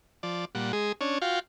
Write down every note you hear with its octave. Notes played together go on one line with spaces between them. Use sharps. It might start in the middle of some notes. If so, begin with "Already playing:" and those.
F3 D5
A#2 G3 F#5
G#3 G#4
C#4 D4 C#5
F4 F#4 F5 G5